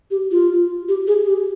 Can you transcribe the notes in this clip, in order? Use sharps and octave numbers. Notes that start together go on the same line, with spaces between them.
G4
F4
G4
G#4
G4